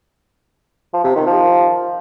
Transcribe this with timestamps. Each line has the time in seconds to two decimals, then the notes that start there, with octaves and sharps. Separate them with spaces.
0.93 F3
1.04 C3
1.15 D#3
1.26 F3